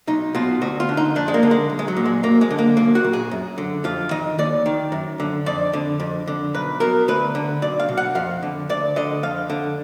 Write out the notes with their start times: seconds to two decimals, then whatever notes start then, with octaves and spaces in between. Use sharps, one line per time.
0.07 B1 D#4
0.35 B2 F4
0.61 D2 F#4
0.80 F4
0.89 D3
0.97 D#4
1.15 F2 D4
1.28 G#3
1.34 A#3
1.43 D3
1.51 G#3
1.70 B1
1.79 G#3
1.88 F#3
1.97 A#2
2.06 G#3
2.23 F#2 A#3
2.41 G#3
2.51 D3
2.59 A#3
2.77 B1 A#3
2.95 F#4
3.04 A#2
3.13 G#4
3.31 F#2
3.58 D3
3.84 F2 F4
4.11 D#3 D#5
4.38 D#2 D5
4.66 D#3
4.92 F#2
5.20 D3
5.46 F2 D5
5.73 D3
6.00 F2
6.27 D3
6.54 B1 B4
6.80 B2 A#4
7.08 D2 B4
7.35 D3
7.62 B1 D5
7.80 F5
7.89 B2
7.97 F#5
8.15 F2 F5
8.43 D3
8.69 D2 D5
8.96 D3 D#5
9.23 F2 F5
9.50 D3